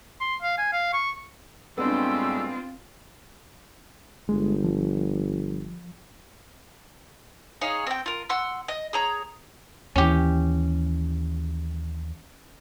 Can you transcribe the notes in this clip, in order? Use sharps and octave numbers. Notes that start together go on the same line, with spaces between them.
C6
F5
G#5
F5
C#6
A2 G3 G#3 B3 C4 D4 F4 E6
G1 G#3
F3
D#4 G#4 C#5 F5
C4 G5
F4 A#4
F#5 C6 E6
D#5
G#4 C#5 A#5
D#2 E3 C#4 G4